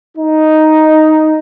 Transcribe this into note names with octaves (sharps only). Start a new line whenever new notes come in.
D#4